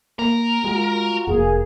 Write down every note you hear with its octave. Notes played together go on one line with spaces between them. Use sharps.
A#3 A#4
G#3 F4 F#4
F1 A#3 G#4